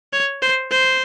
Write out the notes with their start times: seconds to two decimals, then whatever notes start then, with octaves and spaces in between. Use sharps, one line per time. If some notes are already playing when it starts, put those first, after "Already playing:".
0.13 C#5
0.42 C5
0.71 C5